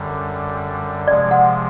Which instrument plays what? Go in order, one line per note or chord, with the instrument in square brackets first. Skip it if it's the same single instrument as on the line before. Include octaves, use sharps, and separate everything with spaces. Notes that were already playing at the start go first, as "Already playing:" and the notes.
Already playing: [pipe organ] F#2 D3 G3
[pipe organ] C3 F3 G#3 [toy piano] D5
[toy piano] F#5